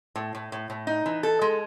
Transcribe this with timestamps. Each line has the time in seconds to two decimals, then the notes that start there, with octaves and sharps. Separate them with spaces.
0.16 A2
0.35 A2
0.52 A2
0.70 A2
0.87 D#4
1.06 E3
1.23 A4
1.42 G#3